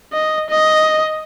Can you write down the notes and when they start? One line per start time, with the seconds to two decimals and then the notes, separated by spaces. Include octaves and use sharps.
0.13 D#5
0.50 D#5